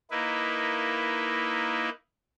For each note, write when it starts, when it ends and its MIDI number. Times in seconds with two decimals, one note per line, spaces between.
0.11 1.89 58
0.11 1.89 63
0.11 1.89 64
0.11 1.89 71